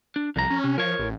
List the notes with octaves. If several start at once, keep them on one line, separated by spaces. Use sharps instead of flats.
D4
C2 F2 A#5
C#4
C3
F3 A#4 C#5
A1